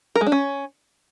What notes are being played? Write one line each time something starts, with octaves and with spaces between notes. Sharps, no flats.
A#4
G#3
D4
C#4